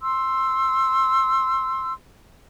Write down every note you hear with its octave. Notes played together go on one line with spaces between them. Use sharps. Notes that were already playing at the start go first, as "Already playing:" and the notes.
C6 E6